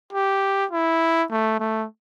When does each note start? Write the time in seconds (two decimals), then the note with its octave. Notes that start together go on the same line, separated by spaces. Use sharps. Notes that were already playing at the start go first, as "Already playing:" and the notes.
0.13 G4
0.71 E4
1.31 A3
1.59 A3